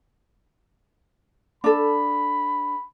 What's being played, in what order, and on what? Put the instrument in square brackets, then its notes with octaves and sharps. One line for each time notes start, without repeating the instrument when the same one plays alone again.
[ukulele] D4 A4 [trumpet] B5